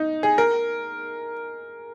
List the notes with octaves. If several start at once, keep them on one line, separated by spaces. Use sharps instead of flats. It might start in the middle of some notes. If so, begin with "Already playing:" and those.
Already playing: D#4
G#4
A#4